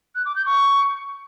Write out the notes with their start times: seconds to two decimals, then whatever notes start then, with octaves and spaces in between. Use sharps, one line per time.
0.15 F#6
0.25 D6
0.36 G6
0.46 C#6